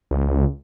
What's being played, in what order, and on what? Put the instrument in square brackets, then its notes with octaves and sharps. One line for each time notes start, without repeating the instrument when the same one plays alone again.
[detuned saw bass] C#2